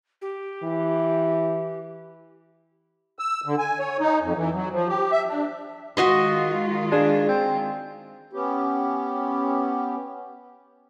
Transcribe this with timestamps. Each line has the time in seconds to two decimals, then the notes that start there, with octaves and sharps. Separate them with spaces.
0.22 G4
0.64 E3
3.19 E6
3.46 D3
3.59 G#5
3.79 C#5
4.00 D#4
4.22 F2
4.36 E3
4.53 F#3
4.71 F3
4.88 G4
5.12 E5
5.28 D4
5.97 D#3 G#3 F4 F#4 D#5 C6 B6
6.92 D4 G#4
7.29 C4
8.33 B3 C#4 G4